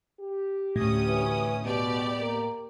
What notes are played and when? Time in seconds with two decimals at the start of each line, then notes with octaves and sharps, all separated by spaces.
0.21 G4
0.76 D2 A2 C#4 D#6
1.08 E3
1.63 B2 G3 G#3 B3 G4 D5
2.20 A#3